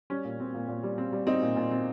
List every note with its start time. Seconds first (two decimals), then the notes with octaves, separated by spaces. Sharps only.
0.10 G3 C#4
0.25 A#2
0.40 C4
0.54 A#2
0.68 A#2
0.83 G3
0.98 C4
1.13 G3
1.27 C4 D#4
1.42 A#2
1.56 A#2
1.71 C4